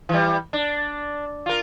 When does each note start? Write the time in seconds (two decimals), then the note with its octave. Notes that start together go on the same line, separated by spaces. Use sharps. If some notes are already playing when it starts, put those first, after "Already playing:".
0.09 E3 G3
0.53 D4
1.46 F4 A#4